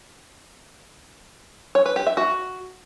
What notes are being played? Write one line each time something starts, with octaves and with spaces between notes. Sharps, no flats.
C#5
B4
G4
E5
F#4